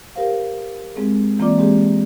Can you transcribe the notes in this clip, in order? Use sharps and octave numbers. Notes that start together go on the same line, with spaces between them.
G4 A#4 C5 F5
G#3 C4 G#4
E3 A#3 C4 F4 D5 D6
G#3 C4 G4 G#4